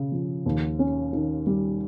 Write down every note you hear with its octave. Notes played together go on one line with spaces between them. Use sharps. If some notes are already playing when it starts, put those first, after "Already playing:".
Already playing: C#3
F3
D#2
C#4
D#3
G3